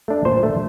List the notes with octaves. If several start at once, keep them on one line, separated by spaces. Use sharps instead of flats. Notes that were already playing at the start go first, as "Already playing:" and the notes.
A3 D4
A#2 C5
A3 D4